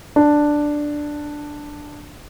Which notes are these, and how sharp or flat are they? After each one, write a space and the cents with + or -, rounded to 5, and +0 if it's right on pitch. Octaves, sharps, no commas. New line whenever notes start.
D4 +5